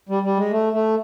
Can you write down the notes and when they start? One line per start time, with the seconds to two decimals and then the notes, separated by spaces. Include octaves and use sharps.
0.09 G3
0.23 G3
0.37 G#3
0.51 A3
0.73 A3